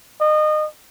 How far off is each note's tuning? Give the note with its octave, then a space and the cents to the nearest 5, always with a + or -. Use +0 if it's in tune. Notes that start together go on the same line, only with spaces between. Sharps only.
D#5 -25